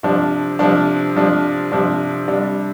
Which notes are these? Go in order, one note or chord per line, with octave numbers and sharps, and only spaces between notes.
C3 F3 D4
C3 F3 D4
C3 F3 D4
C3 F3 D4
C3 G3 D4